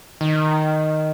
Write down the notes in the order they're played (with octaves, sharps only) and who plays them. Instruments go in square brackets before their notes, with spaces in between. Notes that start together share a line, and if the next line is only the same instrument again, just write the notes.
[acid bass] D#3